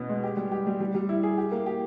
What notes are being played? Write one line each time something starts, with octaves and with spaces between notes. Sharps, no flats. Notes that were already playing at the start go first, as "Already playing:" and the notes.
Already playing: B2 B3 C#4
G#3
G4
G3
G4
G3
G3
G3
E4
G#4
G4
A#3
G4